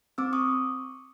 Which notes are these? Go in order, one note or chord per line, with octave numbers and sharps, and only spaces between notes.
C4 D6 E6
C#6 D#6